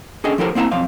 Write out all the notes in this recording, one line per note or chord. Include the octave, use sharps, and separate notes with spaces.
C#4 D4 G#4 A4 D#5 G5
F3 E4 G4 A4 A#4 C5
A#3 C4 E4 F5 A5 A#5
B1 F3 C4 F5